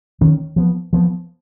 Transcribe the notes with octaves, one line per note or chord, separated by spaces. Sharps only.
D#3 A#3 C#4
F3 B3
F3 B3